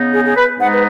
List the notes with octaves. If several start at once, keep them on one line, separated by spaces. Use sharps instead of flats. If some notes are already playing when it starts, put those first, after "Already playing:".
Already playing: C#3 B3 D#4
G#4
G#4
B4
G#2 G#3 B3 D#4 F#5
B4